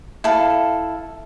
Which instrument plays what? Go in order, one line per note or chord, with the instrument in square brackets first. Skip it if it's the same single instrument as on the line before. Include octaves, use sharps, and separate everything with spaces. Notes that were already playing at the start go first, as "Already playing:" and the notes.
[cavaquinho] E4 A4 F5